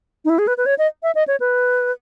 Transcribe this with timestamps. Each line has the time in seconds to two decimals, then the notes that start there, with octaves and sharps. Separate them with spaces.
0.25 D#4
0.30 E4
0.39 G#4
0.47 B4
0.58 B4
0.66 C#5
0.78 D#5
1.03 E5
1.15 D#5
1.28 C#5
1.40 B4